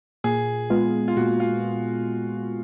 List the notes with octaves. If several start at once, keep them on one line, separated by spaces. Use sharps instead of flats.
A#2 G#4
G#3 B3 F4
F4
A#2 F#4
F4